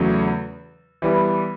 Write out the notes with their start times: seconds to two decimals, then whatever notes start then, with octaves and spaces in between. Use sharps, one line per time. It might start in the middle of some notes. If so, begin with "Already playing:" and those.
Already playing: E2 C#3 F#3 A3
1.02 E3 G3 B3